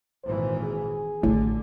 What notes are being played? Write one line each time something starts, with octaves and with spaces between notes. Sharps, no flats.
G#1 A#2 E3 C5
G#4
A1 A2 D3